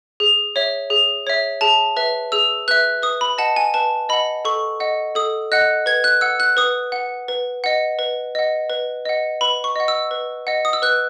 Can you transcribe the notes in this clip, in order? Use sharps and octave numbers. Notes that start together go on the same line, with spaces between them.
G#4
C#5 E5
G#4
C#5 E5
G#4 A5
B4 E5
G#4 E6
B4 E5 F#6
B4 D#6
B5
D#5 F#5 A5
G#5
B4 A5
D#5 F#5 B5
A4 C#6
D#5 F#5
A4 D#6
D#5 F#5 F#6
B4 G#6
F#6
F#5 E6
F#6
B4 D#6
F#5
B4
D#5 F#5
B4
D#5 F#5
B4
D#5 F#5
B4 B5
C#6
D#5 F#5
E6
B4
D#5 F#5
D#6
E6
B4 F#6